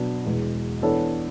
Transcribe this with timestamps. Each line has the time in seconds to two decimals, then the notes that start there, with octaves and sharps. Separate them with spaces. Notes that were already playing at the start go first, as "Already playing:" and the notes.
Already playing: B2 F#3 B3 D4
0.25 E2 B2 G#3
0.82 E3 B3 D4 A4 C#5